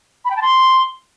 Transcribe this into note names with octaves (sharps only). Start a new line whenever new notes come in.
B5
G5
A5
C6